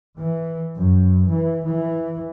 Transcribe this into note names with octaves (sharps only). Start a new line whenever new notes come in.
E3
F#2
E3
E3